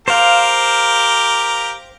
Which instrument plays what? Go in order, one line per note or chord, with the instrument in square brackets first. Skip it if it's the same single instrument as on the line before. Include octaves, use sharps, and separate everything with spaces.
[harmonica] G4 A#4 [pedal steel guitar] C5 F5